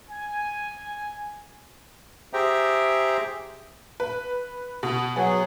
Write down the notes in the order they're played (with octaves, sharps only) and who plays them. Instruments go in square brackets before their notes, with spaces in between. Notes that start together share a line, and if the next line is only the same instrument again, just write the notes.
[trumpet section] G#5
[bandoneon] G4 G#4 C5 E5 G5 A#5
[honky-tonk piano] B4
B2
[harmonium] F#3 G#4 [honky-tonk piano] B3